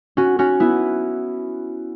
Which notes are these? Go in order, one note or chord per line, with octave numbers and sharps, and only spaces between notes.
C#4 F#4
C#4 F#4
B3 E4